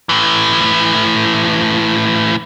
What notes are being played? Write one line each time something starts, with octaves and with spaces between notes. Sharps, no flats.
A2 E3